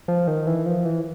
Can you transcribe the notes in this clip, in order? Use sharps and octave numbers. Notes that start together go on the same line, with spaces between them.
F3
D#3
E3
F3
E3